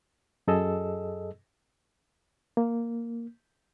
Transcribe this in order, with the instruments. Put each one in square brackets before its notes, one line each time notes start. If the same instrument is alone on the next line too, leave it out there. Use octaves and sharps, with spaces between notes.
[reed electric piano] F#2 G#4 A4 D#5 E6
A#3